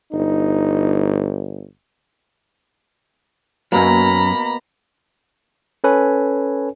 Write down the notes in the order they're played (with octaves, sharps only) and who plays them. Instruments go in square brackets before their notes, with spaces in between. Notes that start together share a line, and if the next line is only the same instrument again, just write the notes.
[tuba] G1 [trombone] D#4
[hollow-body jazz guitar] F#2 F#3 [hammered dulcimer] B2 A#3 [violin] A#5 B5
[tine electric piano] C#4 A4 B4 C#5 G#5